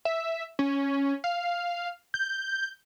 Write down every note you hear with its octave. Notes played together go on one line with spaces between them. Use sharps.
E5
C#4
F5
G6